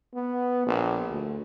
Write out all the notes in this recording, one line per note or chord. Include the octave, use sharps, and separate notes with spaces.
B3
A#1
D2